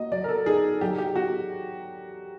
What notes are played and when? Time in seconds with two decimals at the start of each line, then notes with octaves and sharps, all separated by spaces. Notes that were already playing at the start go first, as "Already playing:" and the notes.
Already playing: A#3 F#4 D#5
0.12 F#3 D5
0.24 A#4
0.29 A4
0.46 D#4 G#4
0.81 F#3 G4
0.98 G4
1.16 F#4